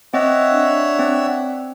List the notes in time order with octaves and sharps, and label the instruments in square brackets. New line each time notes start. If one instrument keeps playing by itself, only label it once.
[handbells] C4 D#5 [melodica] C#5 E5 F#5
[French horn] D4
[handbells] C4